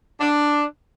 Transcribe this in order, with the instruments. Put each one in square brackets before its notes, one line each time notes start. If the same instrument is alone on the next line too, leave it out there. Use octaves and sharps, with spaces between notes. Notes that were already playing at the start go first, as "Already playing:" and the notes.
[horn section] D4